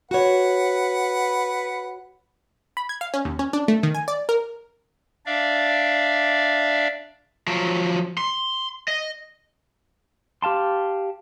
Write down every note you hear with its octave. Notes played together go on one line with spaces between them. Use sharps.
F#4 B4 C#5 F#5
B5
G#6
F5
C#4
D#2
C#4
D4
A3
D#3
G#5
D5
A#4
D4 D5 E5 F5
F3 F#3
C6
D#5
G4 F5 A5 C6